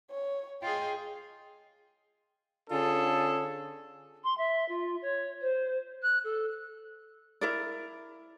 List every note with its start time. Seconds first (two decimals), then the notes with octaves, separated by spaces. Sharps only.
0.11 C#5
0.62 F4 G#4 D#5 G5
2.70 D3 C#4 D4 F4 G#4 A4
4.23 C6
4.37 E5
4.68 F4
5.02 C#5
5.41 C5
6.02 F#6
6.24 A4
7.41 E4 A#4 D5